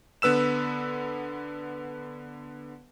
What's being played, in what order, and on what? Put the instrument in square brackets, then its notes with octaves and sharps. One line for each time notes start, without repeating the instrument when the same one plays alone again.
[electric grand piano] D3 B3 B4 E6 E7